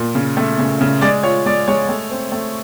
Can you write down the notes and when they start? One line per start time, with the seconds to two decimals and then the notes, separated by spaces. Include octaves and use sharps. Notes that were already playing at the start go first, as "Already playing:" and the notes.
Already playing: A#2
0.15 C#3
0.37 A3
0.59 C#3
0.81 C#3
1.01 G#3 D5
1.23 F4 C#5
1.46 G#3 D5
1.68 G#3 C#5
1.89 A3
2.11 C4
2.32 A3